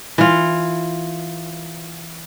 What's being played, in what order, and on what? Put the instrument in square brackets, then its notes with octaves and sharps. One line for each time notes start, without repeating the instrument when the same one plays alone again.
[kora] E3 F4